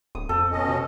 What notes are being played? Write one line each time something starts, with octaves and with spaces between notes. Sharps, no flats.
D1 D#6
F2 A4
B2 C#4 D#5
C3